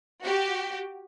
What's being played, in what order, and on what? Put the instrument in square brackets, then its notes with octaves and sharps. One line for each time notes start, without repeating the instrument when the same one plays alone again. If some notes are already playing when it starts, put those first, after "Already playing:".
[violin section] F#4 G4